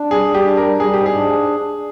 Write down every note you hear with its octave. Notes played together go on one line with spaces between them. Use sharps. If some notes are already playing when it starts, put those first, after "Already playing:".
Already playing: D4
G3 G#4
G3
G4
D4
A#4
G3
G3 G#4
G#2 G4
G#4
D4